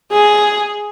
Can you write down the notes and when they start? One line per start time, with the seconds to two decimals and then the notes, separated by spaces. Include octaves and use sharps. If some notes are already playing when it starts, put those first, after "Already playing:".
0.12 G#4